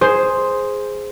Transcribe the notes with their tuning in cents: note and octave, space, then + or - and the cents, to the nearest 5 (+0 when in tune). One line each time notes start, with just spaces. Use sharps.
G#4 +0 C5 +0